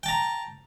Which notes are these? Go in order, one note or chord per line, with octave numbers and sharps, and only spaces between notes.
G5 A5 A#5